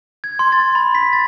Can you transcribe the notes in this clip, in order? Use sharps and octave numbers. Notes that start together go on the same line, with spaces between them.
G#6
C6
A6
B5
B6
A6